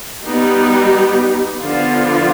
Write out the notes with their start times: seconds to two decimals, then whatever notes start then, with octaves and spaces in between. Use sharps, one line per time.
0.22 G3 B3 D#4 G4
1.58 D3 F3 B3 F4